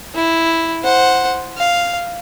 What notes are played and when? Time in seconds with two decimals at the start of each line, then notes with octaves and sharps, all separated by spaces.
0.15 E4
0.82 C5 F#5
1.57 F5